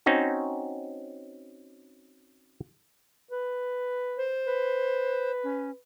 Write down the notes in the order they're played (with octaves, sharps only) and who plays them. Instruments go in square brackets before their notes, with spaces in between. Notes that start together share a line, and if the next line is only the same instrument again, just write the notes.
[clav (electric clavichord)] C4 C#4 D#4 F#4
[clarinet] B4
[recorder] C5
[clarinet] B4
[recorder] C#4